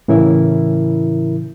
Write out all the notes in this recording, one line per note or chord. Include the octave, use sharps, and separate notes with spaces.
A2 C#3 E3 E4 A#4 E5